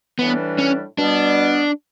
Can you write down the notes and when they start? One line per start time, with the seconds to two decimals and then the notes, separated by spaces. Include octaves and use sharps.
0.18 A2 E3 G3 B3 D4
0.58 C#4
0.98 B2 G3 B3 D4